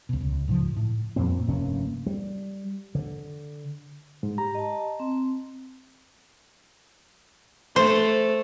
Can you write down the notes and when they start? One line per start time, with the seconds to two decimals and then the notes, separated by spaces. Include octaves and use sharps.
0.09 C#2 B2
0.21 C#2
0.48 C#2 G#2 C#3 F3
0.77 A2
1.16 F2 A#2 A#3 C4
1.48 F1 G2 A#3 C#4
2.06 G3
2.95 D3
4.23 G#2
4.38 G4 A#5
4.55 D#5 A5
5.00 C4
7.76 A3 C5